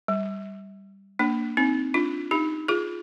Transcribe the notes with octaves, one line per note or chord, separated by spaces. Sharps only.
G3
A#3 D4
C4 D#4
D4 F4
D#4 G4
F4 G#4